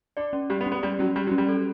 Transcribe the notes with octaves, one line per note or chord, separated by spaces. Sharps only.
D4 D5
C#4
G3 G4
B3
C#4
B3
G3 D5
F#3 C#4
G3 G4
F#3
C#4
G3
A4